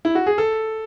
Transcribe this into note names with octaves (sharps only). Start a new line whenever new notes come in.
E4
F#4
G#4
A4